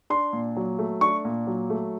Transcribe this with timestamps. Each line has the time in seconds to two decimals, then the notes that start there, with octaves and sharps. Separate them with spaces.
0.10 D4 C6
0.33 A#2
0.57 F#3
0.79 A3
1.01 D4 C#6
1.25 A#2
1.47 F#3
1.70 A3